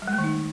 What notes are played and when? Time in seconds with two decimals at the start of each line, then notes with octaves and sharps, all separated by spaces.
0.02 G3
0.07 G#3
0.13 A3
0.18 D#3
0.24 D#4